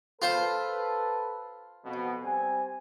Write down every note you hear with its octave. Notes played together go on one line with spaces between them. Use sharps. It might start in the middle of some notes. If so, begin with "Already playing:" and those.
F4 A4 B4 C5
F2 B2
G3 C4 G#5